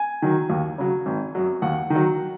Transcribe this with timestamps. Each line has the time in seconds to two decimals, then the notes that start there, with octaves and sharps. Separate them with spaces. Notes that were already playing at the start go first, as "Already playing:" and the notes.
Already playing: G#5
0.22 D#3 F#3
0.50 D#2
0.78 C#3 F#3
1.06 G#1
1.35 F#2 F#3
1.62 D#2 F#5
1.90 D#3
1.95 F#3